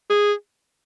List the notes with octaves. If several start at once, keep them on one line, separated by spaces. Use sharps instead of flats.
G#4